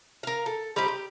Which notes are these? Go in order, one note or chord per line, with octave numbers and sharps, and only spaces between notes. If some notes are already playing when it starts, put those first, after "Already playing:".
A#4 F5
A4
G3 C4 D#4 G4
G4